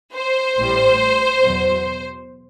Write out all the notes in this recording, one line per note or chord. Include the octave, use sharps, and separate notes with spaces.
C5
A1 A2 G3
E2 B2 F#3